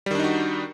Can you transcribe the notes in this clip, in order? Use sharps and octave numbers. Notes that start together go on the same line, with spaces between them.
D#3 G3 D4 D#4 F#4